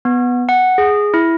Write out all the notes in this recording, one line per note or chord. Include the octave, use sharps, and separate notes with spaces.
B3
F#5
G#4
E4